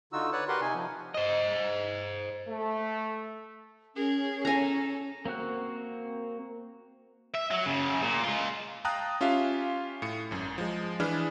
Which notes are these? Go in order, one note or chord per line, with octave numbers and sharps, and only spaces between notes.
D3 D#4 F4 F#4 E6
B4 C#5 D5 F#5 F#6
F#4 G4 A#4 B4 F#5 C6
C3 D#4 G#5
F3
C5 D#5
A3
C#4 G#4 A#4
A4 G#5 A#5
A#3 C4 F#4 F#6
E5
F#3
F#2 C#3
A#2
G#3 F4
F5 G5 A5 A#5 D#6 F#6
C#4 F4 G4 E5 F5
A2 C#7
G#1 F#2
F3 G#3
E3 D4 G#4 B4 F6